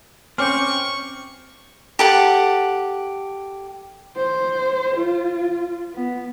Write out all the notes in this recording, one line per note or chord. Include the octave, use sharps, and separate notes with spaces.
C4 C#4 G#5 C#6 D6 F6 G6
G4 A4 F#5
C5
F4
B3